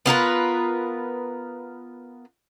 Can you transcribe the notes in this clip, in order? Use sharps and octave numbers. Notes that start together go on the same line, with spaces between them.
B3 F4 A#4 B4